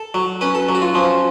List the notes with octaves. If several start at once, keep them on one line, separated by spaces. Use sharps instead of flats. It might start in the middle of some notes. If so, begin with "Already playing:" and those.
Already playing: A4
F#3
C#4 B4
A4
F#3
F#4
F4
F3 C#4